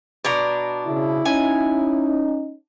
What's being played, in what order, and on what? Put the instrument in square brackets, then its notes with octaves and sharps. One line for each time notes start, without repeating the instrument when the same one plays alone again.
[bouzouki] B2 D4 A#5
[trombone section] C#3 [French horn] E4
[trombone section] C#4 D#4 [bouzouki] G#5